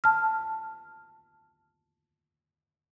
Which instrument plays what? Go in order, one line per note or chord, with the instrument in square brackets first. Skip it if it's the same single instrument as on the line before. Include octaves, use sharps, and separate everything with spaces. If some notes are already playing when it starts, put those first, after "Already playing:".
[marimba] A5 F6